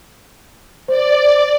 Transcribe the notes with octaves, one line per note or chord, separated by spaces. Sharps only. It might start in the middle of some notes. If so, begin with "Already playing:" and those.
C5 D5